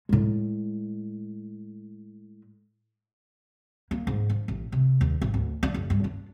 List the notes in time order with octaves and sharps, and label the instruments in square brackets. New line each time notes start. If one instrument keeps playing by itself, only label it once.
[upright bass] A2 G#3
A#3
G#2
F3
A1
C3
D#2
A1
D2
D4
F#1
G2
D4